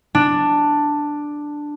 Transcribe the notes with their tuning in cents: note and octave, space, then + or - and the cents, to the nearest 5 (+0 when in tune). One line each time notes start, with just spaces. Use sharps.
D4 +5